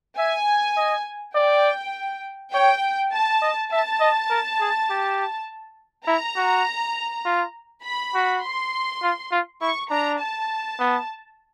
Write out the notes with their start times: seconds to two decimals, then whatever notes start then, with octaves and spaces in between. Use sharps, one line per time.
0.17 E5 G#5
0.77 D#5
1.35 D5 G5
2.53 C#5 G5
3.13 A5
3.42 D#5
3.72 E5 A5
4.00 D#5
4.30 A#4
4.60 G#4
4.90 G4
6.07 E4 A#5
6.36 F#4
7.25 F4
7.85 B5
8.14 F#4
8.43 C6
9.02 F4
9.31 F4
9.61 E4 C#6
9.90 D4 A#5
10.20 A5
10.79 B3